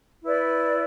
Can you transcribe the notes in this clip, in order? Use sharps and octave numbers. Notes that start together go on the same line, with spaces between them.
E4 B4 D5